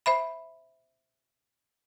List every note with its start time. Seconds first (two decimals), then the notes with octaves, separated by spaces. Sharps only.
0.06 C5 E5 B5